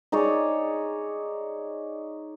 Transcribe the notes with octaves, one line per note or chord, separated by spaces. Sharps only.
D#4 G#4 C#5 D5